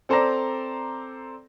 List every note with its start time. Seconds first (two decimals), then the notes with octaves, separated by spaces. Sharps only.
0.09 C4 A4 C5 D5 A#5 A#6